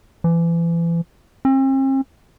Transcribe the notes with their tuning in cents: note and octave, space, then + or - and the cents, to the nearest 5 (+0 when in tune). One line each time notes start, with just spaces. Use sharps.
E3 +35
C4 +45